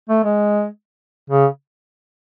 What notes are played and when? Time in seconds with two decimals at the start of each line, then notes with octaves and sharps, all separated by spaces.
0.09 A3
0.24 G#3
1.30 C#3